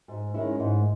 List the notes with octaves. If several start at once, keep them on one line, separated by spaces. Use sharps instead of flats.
G#2
D#3 G#3 C#4 E4
G#2